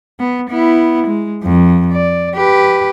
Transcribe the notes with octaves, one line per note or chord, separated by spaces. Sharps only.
B3
B3 E4
G#3
F2
D5
G4 B4